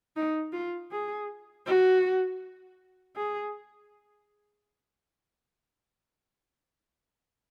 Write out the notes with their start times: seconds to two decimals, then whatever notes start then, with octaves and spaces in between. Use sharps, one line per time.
0.16 D#4
0.53 F4
0.91 G#4
1.66 F#4
3.16 G#4